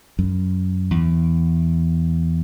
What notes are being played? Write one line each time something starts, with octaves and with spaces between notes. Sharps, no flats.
F#2
E2